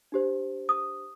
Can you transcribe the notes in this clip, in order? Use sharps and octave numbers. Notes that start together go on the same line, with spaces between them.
D4 G4 C5
D#6